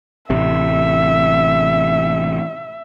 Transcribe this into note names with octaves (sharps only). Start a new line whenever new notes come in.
A1 C3 E5